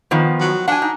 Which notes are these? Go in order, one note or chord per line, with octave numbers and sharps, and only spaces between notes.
D#3 F3 B3
F#3
D4 F#5 G#5
D#4